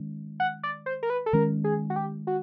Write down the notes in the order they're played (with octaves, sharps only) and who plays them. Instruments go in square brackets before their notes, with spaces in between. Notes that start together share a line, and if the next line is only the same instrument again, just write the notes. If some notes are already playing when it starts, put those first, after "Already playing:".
Already playing: [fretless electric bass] D#3 G#3 C#4
[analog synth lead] F#5
D5
C5
A#4
B4
A4
[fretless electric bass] D#3 G#3 C#4 [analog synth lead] A#4
[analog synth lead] G#4
F#4
G4
F#4